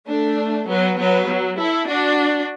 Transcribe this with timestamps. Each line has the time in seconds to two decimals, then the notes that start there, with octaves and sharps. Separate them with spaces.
0.09 A3 D4
0.69 F#3 B3
0.99 F#3 B3
1.29 F#3
1.59 E4 A4
1.88 D4 F#4